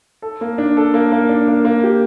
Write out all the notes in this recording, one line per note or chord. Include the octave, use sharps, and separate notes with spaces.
A4
A#3
D4
A4
A#3
A#3
D4
A#3
A#3
G4